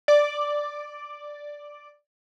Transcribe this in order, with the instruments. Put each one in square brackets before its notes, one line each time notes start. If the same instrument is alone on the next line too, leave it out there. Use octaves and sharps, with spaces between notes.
[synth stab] D5 D6